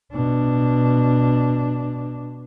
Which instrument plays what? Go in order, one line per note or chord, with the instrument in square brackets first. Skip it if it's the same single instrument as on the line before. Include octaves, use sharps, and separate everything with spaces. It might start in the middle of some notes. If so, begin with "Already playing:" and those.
[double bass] B2 D4